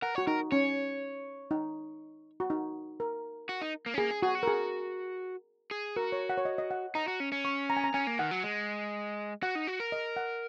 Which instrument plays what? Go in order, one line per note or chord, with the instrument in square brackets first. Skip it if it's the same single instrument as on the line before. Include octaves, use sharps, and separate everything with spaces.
[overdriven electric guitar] A#4 [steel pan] F#5
[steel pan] F#4 [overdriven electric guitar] C#5
[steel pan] D#4 [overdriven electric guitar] A#4
[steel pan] C#4 [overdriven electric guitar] C#5
[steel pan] D#4
F#4
D#4
A#4
[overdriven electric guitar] F#4
D#4
A#3
C#4
[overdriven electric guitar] A#3 [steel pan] G#4
[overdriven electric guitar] G#4
[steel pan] F#4 [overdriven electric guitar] G#4
[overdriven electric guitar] F#4
[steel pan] A#4
G#4
[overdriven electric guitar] G#4
[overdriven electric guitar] F#4 [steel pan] A#4
[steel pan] C#5
F#5
C#5
D#5
D#5
F#5
[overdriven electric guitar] D#4 [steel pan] A#5
[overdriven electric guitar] F#4
C#4
C#4
[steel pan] C#6
A#5
G#5
A#5
[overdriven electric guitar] C#4 [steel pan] G#5
[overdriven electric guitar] A#3
[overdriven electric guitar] D#3 [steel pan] F#5
[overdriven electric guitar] F#3
G#3
[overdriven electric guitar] F#4 [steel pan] F#5
[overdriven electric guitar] D#4
F#4
A#4
[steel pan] D#5
F#5